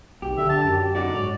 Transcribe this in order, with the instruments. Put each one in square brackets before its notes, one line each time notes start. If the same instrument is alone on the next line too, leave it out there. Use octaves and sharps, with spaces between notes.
[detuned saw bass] B1 [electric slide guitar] G4
[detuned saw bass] D3 [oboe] E5
[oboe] A5
[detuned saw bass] F#2
[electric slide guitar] D3 D#4 F#4 [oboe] D5
[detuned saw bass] G#2 [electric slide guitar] C#5